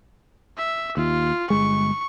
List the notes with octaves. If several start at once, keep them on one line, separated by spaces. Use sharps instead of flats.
E5
D#2 F4
G1 G#3 C#6